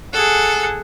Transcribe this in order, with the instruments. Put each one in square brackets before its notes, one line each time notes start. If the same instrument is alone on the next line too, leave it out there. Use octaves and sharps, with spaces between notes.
[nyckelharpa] G#4 F#5 [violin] A4